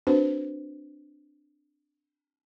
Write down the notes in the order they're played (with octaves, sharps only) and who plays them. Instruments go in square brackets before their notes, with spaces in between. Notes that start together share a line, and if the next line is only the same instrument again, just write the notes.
[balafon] C4 D4 F#4 B4 C5